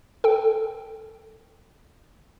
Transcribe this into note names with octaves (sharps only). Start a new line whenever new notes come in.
A4 G5